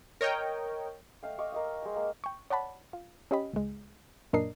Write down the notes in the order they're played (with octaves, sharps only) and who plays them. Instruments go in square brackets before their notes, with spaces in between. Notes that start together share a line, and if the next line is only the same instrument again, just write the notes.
[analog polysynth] A#4 C#5 D#5 G5
[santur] A3 D#5 F5 G5
D#5 F5 C#6 D6
A#4 D#5 F5
G#3 G5
A#3
[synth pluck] G5 C#6
C#5 D5 F#5 A5 B5
F4
C#4 G4 D#5 B5
C#2 G#3
F#2 A#2 D4 A#4 D#5 C7